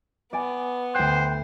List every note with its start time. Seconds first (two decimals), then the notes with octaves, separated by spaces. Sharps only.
0.33 B3 D5 G#5
0.95 D2 C5 G5 F#6 D#7